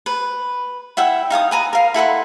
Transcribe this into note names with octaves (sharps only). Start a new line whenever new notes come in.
B4
E4 E5 F#5 G5
D#4 F5 G#5 D#6
B4 G#5 A#5
A#4 F5
E4 A4 F#5 C6